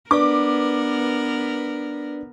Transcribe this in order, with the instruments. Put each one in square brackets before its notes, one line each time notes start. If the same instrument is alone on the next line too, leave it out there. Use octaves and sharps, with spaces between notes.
[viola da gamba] B3 A#4 [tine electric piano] D4 B4 D5 [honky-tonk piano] D6